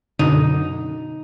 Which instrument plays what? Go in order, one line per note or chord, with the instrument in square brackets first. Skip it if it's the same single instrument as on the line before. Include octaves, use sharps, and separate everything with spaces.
[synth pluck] F#2 B2 D3 [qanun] D#4